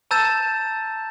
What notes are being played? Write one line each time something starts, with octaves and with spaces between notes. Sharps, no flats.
A5 A#5 E6 G6 A6 E7